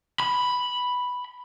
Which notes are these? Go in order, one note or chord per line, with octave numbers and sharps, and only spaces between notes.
B5